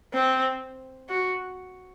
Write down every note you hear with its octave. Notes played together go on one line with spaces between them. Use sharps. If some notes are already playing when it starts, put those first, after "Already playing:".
C4
F#4